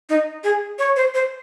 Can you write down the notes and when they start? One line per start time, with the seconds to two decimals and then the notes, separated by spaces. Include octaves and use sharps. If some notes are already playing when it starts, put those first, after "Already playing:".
0.09 D#4
0.44 G#4
0.79 C#5
0.96 C5
1.14 C5